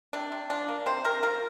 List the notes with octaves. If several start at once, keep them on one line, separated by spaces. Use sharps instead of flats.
C3 D4
C3
F3 D4
A#3
C3 C5
C3 A#4
F3 A#4